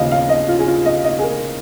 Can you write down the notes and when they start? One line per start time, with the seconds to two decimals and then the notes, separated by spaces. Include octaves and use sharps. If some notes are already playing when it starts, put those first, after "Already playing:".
Already playing: D#2 C#3 F3 D#5 F5
0.11 F5
0.29 D#5
0.48 F4
0.59 G#4
0.67 F4
0.85 D#5
1.04 D#5
1.19 G#4
1.23 A#4